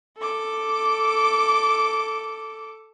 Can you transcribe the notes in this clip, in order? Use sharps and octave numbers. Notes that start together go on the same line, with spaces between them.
A4 D6